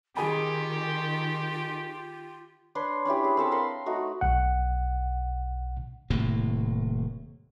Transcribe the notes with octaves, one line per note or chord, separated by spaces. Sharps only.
D#3 F4 G4 G#4 G#5 B5
D4 B4 C#5 C6
C#4 D4 E4 G4
G#4
C4 A4 A5 B5
A#4 F5 B5 C6
A3 D#4 F#4
B1 F#5
D#1 A2 C3 A#3